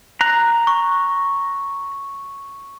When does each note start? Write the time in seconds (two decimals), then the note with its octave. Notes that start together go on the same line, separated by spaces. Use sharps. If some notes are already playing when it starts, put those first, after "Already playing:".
0.21 A#5 F#6
0.67 C#6